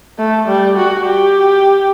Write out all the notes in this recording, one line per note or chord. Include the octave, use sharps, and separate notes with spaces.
A3
G3
F#4
G4